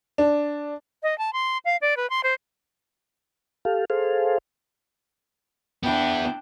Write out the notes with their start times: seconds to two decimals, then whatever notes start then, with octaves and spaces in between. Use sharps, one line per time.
0.18 D4
1.03 D#5
1.18 A5
1.33 C6
1.65 F5
1.81 D5
1.97 B4
2.10 C6
2.23 C5
3.65 G4 A4 F5
3.90 G#4 A4 C5 F5
5.83 B3 D4 E4 G5